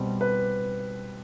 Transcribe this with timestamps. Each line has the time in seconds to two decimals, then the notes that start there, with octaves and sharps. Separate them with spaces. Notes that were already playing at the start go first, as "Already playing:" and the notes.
Already playing: B2 G3 C4
0.21 B4